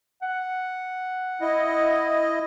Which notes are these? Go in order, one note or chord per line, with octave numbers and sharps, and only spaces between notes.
F#5
E4 D#5